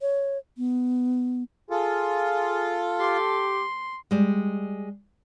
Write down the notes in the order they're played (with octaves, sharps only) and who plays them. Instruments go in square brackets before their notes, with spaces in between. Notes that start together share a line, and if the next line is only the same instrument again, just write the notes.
[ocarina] C#5
B3
[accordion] F4 [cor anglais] G#4 [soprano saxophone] A4
[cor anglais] G4 [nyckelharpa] C6
[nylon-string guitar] G3 G#3